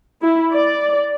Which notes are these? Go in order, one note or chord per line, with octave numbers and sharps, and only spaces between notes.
E4
D5